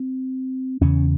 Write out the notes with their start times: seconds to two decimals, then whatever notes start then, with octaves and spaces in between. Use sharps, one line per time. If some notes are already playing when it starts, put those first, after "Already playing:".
Already playing: C4
0.81 E2 C#3 C#4